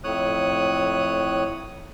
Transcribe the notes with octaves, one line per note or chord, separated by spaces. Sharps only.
F2 A2 C#5 D#6 F#6